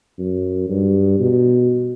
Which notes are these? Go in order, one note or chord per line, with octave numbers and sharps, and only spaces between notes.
F#2
G2
B2